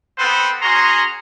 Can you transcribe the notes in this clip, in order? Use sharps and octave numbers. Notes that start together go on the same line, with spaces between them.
B3 C4 A4 B4 C5 F#5
C#4 F#4 G#4 A#5 C6